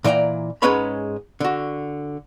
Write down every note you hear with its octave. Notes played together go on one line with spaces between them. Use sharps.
A#2 E3 D5 G5 A#5
G#2 G#3 C#4 B4 C#5 B5
D3 F#4